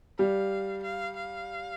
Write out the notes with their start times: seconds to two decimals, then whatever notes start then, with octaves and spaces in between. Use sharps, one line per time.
0.18 G3 F5
0.83 F5
1.16 F5